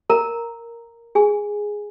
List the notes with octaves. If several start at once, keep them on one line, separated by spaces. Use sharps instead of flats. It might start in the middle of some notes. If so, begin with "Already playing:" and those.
A#4 A#5
G#4 G#5